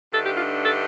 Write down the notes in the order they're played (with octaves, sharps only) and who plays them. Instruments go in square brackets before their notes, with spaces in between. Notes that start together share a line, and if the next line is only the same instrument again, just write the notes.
[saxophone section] G2 D3 A3 D#4 A4
G4
F4
A4